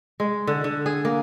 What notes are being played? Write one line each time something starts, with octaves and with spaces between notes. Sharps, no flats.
G#3
D3
D3
G#4
A#3